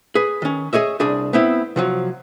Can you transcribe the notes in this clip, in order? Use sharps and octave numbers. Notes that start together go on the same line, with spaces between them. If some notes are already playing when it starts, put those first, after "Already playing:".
G#4 B4
D#3 C#4
G#4 C#5 D#5 E5
C2 D4 G#4 D5
B3 C4 E4
C3 F3 F#3